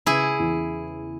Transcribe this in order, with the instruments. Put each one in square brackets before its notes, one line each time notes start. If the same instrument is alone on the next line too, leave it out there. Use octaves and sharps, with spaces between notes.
[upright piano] C#3 [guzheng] E4 G#4
[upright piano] E2